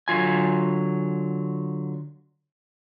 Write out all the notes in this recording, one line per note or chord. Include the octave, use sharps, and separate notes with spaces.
D3 F#3 F4 G#5